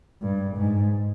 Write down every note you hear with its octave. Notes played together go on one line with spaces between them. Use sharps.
G2
G#2